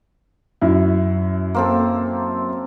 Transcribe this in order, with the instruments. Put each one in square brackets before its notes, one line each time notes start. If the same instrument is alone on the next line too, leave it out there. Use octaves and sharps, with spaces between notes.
[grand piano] F#2 E4
[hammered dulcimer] A#3 C4 A4